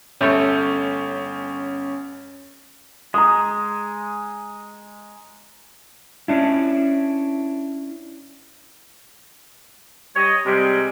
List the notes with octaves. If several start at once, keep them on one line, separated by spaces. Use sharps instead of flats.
G1 G3 A3 C#4 C#5 G6
G#3 A#5 D#6
C#4 D4 E4
G3 C#5 D#5
C3 G3 G#3